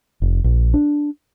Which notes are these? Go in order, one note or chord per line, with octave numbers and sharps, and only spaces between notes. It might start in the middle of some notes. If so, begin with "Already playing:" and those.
F1
A#1
D4